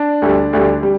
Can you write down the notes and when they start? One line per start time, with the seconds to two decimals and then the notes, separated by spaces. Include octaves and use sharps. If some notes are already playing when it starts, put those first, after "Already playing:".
Already playing: D4
0.22 D2 D3 G3
0.53 D2 D3 G3
0.83 G3